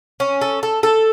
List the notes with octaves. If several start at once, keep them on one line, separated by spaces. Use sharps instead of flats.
C#4
A4
A4
A4